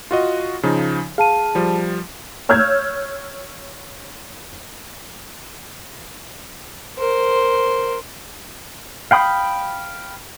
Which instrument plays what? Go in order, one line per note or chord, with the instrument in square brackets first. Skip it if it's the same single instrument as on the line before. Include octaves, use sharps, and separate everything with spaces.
[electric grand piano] F4 F#4 D#5
C#3 F3 D#4
[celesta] G#4 A5 D#7 [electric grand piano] F5
[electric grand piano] F3 G3
[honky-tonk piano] C#5 E6 F6 G6 G#6
[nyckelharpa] A#4 C5
[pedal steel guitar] F5 G5 B5 D#6